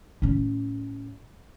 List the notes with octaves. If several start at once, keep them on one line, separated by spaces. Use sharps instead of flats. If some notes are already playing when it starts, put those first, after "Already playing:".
A2 C#4